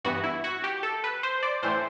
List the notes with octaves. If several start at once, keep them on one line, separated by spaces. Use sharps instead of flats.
G2 E3 B3 F#4
E4
F#4
G4
A4
B4
C5
D5
A2 E3 A3 C5